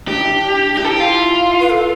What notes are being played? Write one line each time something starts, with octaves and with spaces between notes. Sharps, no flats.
D4 G4
E4
D4
D4
E4 G4
A4
G4
F4
B4
A4